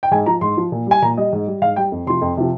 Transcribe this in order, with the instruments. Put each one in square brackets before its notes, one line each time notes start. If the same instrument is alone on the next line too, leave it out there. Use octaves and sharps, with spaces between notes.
[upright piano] G5
G#2 G#5
F3 A#5
G#2 C6
F3
A#2
G3 G#5
A#2 A#5
G3 D#5
G#2
G3
G#2 F5
G3 G5
F2
C3 F3 C6
F2
C3 F3